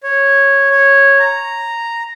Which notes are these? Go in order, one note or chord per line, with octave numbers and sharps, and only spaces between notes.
C#5
C#5
A#5